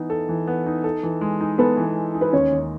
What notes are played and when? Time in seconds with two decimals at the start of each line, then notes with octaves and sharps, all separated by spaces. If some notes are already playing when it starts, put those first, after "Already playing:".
Already playing: E3 B3 D#4
0.10 A4
0.29 E3
0.47 B3
0.66 D#4
0.84 A4
1.03 E3
1.21 G#3
1.41 D#4
1.58 B3 A4 B4
1.77 E3
1.96 G#3
2.14 D#4
2.21 B4
2.33 D#2 C#4 C#5
2.52 D#2